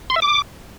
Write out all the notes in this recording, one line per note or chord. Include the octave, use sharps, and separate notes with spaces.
C6
E5
D6